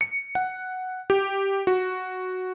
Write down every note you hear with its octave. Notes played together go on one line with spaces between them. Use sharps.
C#7
F#5
G4
F#4